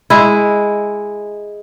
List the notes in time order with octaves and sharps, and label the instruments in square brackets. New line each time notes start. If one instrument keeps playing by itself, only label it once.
[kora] G#3 E4